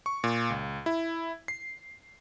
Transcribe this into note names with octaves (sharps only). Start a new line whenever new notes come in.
C#6
A#2
C#2
E4
C7